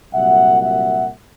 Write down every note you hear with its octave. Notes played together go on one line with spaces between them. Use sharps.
C2 A#2 F#3 E5 F#5
E5 F#5